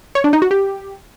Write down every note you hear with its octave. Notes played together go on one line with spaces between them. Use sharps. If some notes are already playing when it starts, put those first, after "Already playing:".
C#5
D4
D#4
F#4
G4